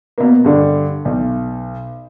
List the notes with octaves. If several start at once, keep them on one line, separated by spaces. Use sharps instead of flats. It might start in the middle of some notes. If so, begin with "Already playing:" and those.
B2 A#3
G2 D3
B1